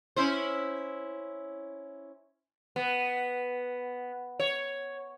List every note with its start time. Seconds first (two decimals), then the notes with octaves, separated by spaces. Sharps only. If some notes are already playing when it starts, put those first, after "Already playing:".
0.16 C#4 E4 C5
2.76 B3
4.40 C#5